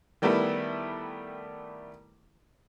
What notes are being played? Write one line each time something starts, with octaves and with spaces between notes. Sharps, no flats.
D#3 G3 A3 B3 E4